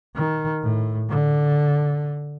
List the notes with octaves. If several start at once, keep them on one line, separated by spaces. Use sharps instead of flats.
D#3
A2
D3